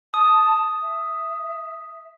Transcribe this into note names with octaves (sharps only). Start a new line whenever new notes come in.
A5 D#6
E5